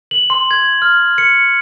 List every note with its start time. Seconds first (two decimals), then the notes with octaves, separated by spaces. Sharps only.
0.11 F#7
0.30 C6
0.51 G#6
0.82 F6
1.18 C#7